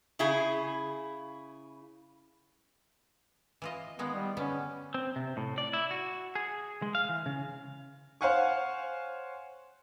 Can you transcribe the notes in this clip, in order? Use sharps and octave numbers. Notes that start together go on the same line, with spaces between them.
C#3 E4 G#4
E3 F4 D#5
D#3 G#3 B3 F5
G3
D3 B3 C#4
C4
C3
A2
D5
E4
F#4
G#4
G#3
F5
E3
C#3
C5 C#5 F5 F#5 G#5 C#6